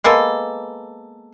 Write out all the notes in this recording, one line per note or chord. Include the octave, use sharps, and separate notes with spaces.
G#3 A#3 B3 A4